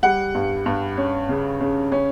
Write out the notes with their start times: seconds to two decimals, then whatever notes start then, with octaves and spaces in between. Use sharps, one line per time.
0.03 G3 F#5
0.35 G2
0.66 G2
0.97 C#4
1.29 C#3
1.60 C#3
1.92 C#4